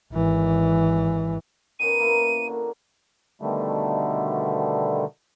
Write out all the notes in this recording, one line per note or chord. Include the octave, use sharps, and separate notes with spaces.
G#1 E3
D#3 B3 C#4 D#7
A#3 E4
D3 A#3 F#4
B2 D3 D#3 G3 A3